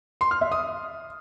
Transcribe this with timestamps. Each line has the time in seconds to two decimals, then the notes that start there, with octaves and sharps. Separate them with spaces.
0.21 C6
0.31 F6
0.41 E5
0.52 D#6